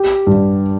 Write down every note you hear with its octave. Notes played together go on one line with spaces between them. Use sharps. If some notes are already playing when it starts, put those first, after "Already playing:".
Already playing: G4
G2